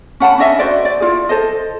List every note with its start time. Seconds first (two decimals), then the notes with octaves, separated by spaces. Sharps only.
0.20 C#4 F#5 A5 B5
0.38 C#4 D4 D#5 E5
0.59 F#4 B4 C5 D5
0.85 D5
1.00 E4 F4 G#4
1.29 A4 C5 D#5